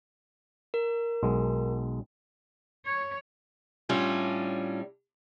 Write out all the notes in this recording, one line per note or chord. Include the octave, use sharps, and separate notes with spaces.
A#4
B1 G#3
C#5
A2 G3 C#4 D4 F4